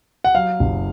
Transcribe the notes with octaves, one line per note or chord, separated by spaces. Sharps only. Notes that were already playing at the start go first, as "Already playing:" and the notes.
F#5
F#3 F5
F#1